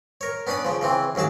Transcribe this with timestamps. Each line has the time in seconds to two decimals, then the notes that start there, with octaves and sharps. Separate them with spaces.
0.21 A#4 C#5
0.47 B3 C#4 D4 D5 D#6
0.65 C#3 F3
0.81 C#3 E3 C4
1.15 A1 D#2 F#3 G#4 A5